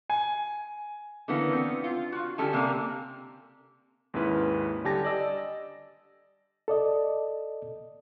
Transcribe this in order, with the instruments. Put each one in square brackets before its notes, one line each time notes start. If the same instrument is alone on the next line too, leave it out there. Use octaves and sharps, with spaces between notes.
[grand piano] G#5
[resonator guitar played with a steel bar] D3 E3 A#3 B3 C#4
B3 C4
F4
F4 F#4
D3 G3 C#4 A4 G5 G#5
C3 A#3 A#4 D5
[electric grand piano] D#2 G#2 C#4 E4 B4
D3 G3 G4 G#5 A5 A#6
D5 D#5 E6
[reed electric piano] A4 D5 D#5